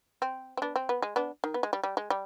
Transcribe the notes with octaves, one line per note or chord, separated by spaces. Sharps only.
C4
C4
B3 D4
C4
B3
G#3
B3 D4
D#3
B3
G#3
G3
G3
G#3
G3